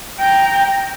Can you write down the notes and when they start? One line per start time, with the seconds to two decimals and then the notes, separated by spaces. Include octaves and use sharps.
0.18 G5 A#5